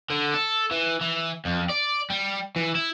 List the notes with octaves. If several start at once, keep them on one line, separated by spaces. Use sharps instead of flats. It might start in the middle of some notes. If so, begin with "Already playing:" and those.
D3
A4
E3
E3
F2
D5
G3
E3
E4